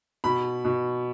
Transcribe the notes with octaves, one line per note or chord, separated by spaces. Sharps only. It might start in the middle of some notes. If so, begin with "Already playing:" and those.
B2 B5
B2